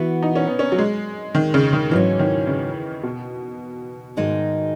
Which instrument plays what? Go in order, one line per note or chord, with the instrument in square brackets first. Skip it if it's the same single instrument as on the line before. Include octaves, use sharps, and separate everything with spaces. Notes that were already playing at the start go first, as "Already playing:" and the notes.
Already playing: [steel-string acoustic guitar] E3 B3 F#4
[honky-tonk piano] D#4
C#4
B3
C#4
F#3
G#3
D#3
C#3
D#3
[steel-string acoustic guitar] G#2 F#3 C#4 [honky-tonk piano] E3
[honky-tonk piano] D#3
C#3
B2
[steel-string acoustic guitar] G#2 D#3 G#3 D#4